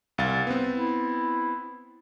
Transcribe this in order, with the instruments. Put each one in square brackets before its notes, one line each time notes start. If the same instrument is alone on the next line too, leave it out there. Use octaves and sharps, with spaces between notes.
[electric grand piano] C2 F5 A6
B3 C4
[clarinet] E4